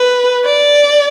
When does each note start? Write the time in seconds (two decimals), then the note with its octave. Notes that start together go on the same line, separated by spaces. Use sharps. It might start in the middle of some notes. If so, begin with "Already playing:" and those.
Already playing: B4
0.45 D5